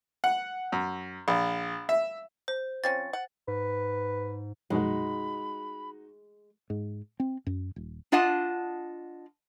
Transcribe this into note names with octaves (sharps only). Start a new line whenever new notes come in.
F#5
F#2
A#1
E5
C5
F3 C4 C#4 A6
F#5
G#2 B4
A#1 F#2 B2 G#3 D#4 F#4 B5
G#2
C4
F#2
D#1
D4 F4 D#5 F#5 A5